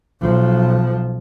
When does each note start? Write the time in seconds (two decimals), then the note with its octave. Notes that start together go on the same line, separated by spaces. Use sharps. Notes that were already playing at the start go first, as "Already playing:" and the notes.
0.22 B1 F3